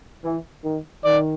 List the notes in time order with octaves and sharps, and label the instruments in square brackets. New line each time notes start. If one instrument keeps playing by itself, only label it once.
[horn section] E3
D#3
[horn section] D#3 [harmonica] D5